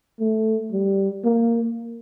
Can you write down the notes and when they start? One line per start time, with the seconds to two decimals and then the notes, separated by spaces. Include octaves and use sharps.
0.20 A3
0.72 G3
1.24 A#3